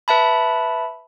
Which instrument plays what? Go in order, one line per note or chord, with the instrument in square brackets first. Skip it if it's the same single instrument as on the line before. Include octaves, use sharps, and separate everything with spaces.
[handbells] B4 E5 A5 B5